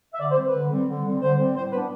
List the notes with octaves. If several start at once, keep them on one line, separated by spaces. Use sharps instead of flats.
E5
D3 D5
C5
G3 C4
B4
D3
G3 C4
D3
G3 C4
D3 C5
G3 C4
A2 C5
G3 B3 D4 B4